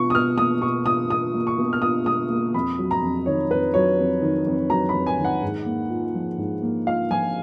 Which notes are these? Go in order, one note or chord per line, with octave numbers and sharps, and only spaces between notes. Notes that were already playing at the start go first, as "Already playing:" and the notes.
Already playing: B2 F4 C#6
D#6
B2 F6
A#3 D#6
B2 C#6
F4 D#6
B2 D#6
A#3
C#6
B2
F6
F4 D#6
B2 D#6
A#3
F2 B5
F#3
A#5
F2
D#3 C#5
F2 B4
F#3 C#5
F2
D#3
F2
F#3 A#5
B5
F2
G#5
D#3
F#5
G#2
A#3
F4
F3
G#2
A#3
F4 F5
F3 G#5